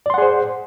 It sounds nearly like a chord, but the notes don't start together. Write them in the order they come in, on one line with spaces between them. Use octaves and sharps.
D5 C6 F#5 G#4 C5